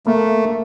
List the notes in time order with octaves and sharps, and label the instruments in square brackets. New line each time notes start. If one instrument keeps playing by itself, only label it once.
[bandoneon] A3 [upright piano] A#3